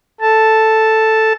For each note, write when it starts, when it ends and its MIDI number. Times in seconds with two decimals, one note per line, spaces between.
0.21 1.33 69
0.21 1.33 81